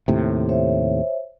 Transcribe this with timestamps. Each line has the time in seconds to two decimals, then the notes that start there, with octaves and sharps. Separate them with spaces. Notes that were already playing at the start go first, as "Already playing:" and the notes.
0.08 D#2 A2 C3
0.49 C5 C#5 E5